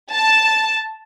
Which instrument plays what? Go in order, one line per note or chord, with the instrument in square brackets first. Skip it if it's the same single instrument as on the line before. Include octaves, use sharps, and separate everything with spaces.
[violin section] A5